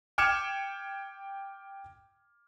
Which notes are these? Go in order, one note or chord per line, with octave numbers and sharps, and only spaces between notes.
G5 D6 F6 G#6 C#7 E7